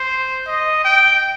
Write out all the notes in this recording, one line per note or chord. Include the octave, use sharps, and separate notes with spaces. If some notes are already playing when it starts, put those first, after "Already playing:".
Already playing: C5
D#5
G5